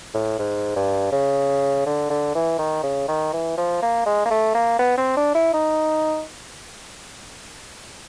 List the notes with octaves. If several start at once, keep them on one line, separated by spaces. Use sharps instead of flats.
A2
G#2
G2
C#3
D3
D3
E3
D#3
C#3
D#3
E3
F3
A#3
G#3
A#3
A3
A#3
B3
C4
D4
E4
D#4